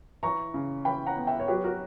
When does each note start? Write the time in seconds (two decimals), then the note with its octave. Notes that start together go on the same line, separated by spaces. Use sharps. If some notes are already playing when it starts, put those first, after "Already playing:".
0.23 E3 A#5 C#6
0.54 C#3
0.85 E3 G5 B5
1.06 F#5 A#5
1.17 B3
1.27 E5 G5
1.40 C#5
1.48 F#3 G4 B4
1.64 F#4 A#4